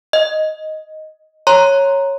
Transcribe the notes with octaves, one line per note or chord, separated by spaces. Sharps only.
D#5
C#5 A#5 C6